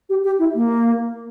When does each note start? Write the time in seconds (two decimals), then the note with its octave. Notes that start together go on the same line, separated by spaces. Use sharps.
0.10 G4
0.24 G4
0.39 E4
0.55 A#3